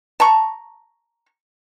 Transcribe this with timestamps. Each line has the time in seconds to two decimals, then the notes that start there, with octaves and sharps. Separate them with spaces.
0.20 A5 A#5 C#6